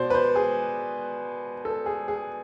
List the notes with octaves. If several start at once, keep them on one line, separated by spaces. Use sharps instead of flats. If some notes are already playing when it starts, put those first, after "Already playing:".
Already playing: B2 C5 D5
B4
C5
G#4
A4
G#4
G#4